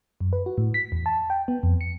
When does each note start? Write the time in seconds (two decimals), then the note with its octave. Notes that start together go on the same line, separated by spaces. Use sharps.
0.20 F#2
0.33 B4
0.46 F#4
0.58 A2
0.74 B6
0.92 E2
1.06 A5
1.30 G5
1.48 B3
1.63 F2
1.81 C#7